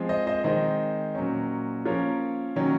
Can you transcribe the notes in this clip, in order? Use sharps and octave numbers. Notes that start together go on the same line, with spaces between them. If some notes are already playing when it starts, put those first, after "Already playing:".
Already playing: F3 G#3 C4
C5 D#5
C5 D#5
D#3 G#3 C4 C5 D#5
A#2 F#3 A#3 C#4
F3 A#3 C#4 A#4 C#5
D#3 F#3 A#3 C#4